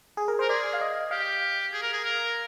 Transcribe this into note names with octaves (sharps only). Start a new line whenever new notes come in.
G#4
A#4
A#4 C5
G#4 D5
F5
D#5
G4 F5
G#4
A#4
G#4
A#4